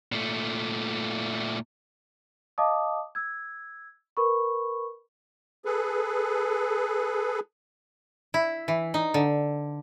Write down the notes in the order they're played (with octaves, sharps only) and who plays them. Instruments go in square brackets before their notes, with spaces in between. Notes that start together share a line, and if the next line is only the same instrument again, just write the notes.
[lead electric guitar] A#2 A3
[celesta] D#5 F5 A5 D6 D#6
E6 G#6
A#4 B4 B5 C#6
[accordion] G#4 A4 B4
[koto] E4
E3
D#4
D3